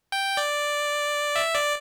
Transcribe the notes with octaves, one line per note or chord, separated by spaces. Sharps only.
G5
D5
E5
D5